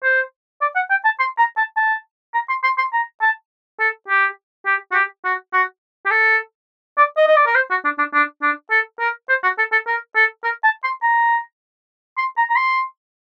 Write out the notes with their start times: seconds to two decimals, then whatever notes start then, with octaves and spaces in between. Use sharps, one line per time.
0.04 C5
0.62 D5
0.76 F#5
0.91 G5
1.05 A5
1.20 C6
1.38 A#5
1.58 A5
1.77 A5
2.34 A#5
2.49 C6
2.64 C6
2.78 C6
2.93 A#5
3.22 A5
3.80 A4
4.08 G4
4.66 G4
4.91 F#4
4.95 G4
5.25 F#4
5.53 F#4
6.06 G4
6.11 A4
6.97 D5
7.17 D#5
7.27 D#5
7.36 D5
7.46 A#4
7.55 C5
7.70 F#4
7.84 D4
7.98 D4
8.14 D4
8.42 D4
8.71 A4
9.00 A#4
9.29 C5
9.43 F#4
9.58 A4
9.72 A4
9.87 A#4
10.16 A4
10.44 A#4
10.64 A5
10.84 C6
11.03 A#5
12.18 C6
12.37 A#5
12.50 A#5
12.56 C6